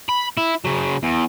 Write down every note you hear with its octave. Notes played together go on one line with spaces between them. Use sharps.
B5
E4
C#3 F#3
E2